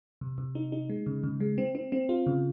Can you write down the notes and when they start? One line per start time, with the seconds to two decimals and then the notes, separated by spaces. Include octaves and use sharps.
0.21 C3
0.38 C3
0.55 D#4
0.72 D#4
0.90 G#3
1.06 C#3
1.24 C#3
1.40 G#3
1.58 C4
1.75 C4
1.92 C4
2.09 F4
2.26 C#3